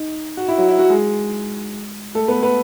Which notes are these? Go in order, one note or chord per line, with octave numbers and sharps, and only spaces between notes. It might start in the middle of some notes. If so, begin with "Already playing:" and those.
Already playing: D#4
F#4
E4
F#3 F#4
E4
F#3 F#4
G#3 G#4
A3 A4
B3 B4
B3 B4